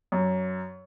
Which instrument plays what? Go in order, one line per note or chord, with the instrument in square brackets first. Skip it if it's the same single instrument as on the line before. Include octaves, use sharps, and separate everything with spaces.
[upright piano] F#2